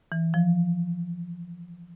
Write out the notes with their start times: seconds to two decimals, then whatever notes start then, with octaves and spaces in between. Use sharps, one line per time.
0.12 E3
0.34 F3